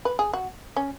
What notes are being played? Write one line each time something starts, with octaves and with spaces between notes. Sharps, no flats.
B4
G#4
F#4
C#4